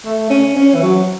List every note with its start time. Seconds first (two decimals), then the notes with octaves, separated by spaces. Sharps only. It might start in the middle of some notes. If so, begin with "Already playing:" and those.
0.05 A3
0.30 C#4
0.56 C#4
0.75 E3
0.82 F#3